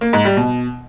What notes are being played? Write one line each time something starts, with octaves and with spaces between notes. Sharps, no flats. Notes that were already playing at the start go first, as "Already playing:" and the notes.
A#3
G#2
G3
B2